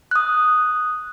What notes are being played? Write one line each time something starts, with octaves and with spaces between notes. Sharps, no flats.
D#6 F#6